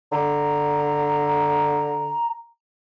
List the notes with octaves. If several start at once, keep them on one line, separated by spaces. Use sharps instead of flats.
D3 A#5